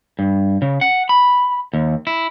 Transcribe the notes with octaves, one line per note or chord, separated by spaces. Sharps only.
G2
C#3
F#5
B5
D#2
E4